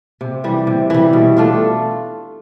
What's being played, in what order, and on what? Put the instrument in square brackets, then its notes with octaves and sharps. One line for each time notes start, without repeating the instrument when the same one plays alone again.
[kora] C3
E3 G3
C3
E3 G3
B2
A3 D4 F4